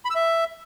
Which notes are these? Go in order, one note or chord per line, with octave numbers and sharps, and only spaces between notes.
B5
E6
E5